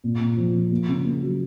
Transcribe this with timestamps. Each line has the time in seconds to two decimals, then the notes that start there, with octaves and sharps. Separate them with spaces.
0.04 A#2
0.20 A#2
0.37 F3
0.55 F3
0.72 A#3
0.89 C#3
1.05 A#3
1.23 F#3